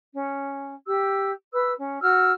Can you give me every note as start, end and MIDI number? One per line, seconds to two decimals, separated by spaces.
0.13 0.75 61
0.86 1.31 67
0.86 1.31 88
1.53 1.72 71
1.53 1.72 88
1.78 1.98 61
2.02 2.31 66
2.02 2.31 88
2.02 2.31 89